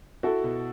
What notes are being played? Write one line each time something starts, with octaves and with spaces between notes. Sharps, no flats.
E4 F#4 A4
B2